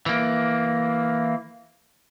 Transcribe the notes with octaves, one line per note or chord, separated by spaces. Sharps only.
E3 A#3